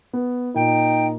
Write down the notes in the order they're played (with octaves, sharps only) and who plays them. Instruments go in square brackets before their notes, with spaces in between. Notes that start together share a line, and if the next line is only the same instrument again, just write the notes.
[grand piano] B3
[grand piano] A#2 [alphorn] D#4 [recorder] G5